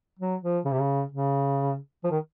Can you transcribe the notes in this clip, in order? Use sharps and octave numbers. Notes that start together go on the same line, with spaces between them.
F#3
F3
C#3
C3
C#3
C#3
F3
D#3